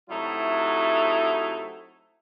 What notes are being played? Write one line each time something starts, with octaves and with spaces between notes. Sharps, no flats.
C3 F#3 A3 D#4 E4 F#4